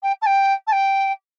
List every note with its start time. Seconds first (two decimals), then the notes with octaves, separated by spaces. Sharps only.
0.03 G5
0.22 A5
0.26 G5
0.67 A5
0.72 G5